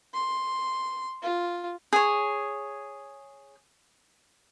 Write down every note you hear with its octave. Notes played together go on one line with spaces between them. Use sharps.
C6
F4
G#4 C#5